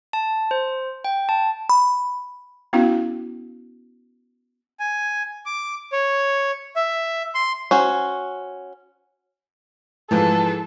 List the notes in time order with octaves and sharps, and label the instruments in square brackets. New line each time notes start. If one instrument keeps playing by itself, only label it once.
[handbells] A5
C5
G5
A5
[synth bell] B5
[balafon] B3 C#4 E4 F#4 F5
[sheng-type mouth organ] G#5
D6
C#5
E5
C6
[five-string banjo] C#4 F#4 C5
[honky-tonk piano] G#2 E3 F3 [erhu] A4